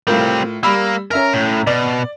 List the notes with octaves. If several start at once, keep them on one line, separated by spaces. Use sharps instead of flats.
A2 G3 C4 F4 A#4
G3 A#3 B5 E6
C#4 A#4 E5 A#5
A2
B2 D5